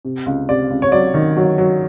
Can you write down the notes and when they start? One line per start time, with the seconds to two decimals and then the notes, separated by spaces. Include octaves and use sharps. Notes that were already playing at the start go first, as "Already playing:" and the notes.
0.05 C3
0.26 C#2
0.49 C3 D5
0.70 C#2
0.82 C#5
0.92 F#3 D5
1.14 D#3
1.36 F#3
1.58 F#3